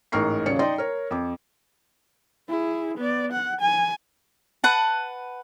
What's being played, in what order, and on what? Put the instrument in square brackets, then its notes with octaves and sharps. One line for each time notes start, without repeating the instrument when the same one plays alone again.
[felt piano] A1 G#2 A#4 C#6 C7
D#1 C#3 C#5 D5 C#7
D#4 D5 D#5 G5 C6
A#4 C#5
F2 D6
[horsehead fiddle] E4 G#4
B3 D5
F#5
G#5
[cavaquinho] B4 F#5 A5